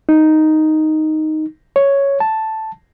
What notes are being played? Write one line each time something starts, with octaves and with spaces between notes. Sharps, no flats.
D#4
C#5
A5